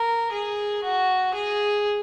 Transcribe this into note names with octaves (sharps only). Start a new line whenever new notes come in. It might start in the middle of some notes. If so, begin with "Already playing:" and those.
Already playing: A#4
G#4
F#4
G#4